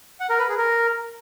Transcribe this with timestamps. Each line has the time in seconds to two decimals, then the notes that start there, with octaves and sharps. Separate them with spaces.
0.20 F#5
0.29 A#4
0.39 B4
0.48 G#4
0.58 A#4